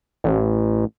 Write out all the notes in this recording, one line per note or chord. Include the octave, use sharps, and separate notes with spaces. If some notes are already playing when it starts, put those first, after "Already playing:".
A1